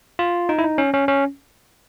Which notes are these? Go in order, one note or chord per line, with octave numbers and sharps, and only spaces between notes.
F4
D#4
E4
D#4
C#4
C#4
C#4